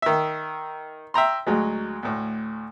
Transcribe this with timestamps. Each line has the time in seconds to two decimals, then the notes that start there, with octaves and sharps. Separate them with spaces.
0.02 D#3 E5
1.14 E5 G5 A#5 C6
1.47 D2 F#3 G#3
2.03 D2 A2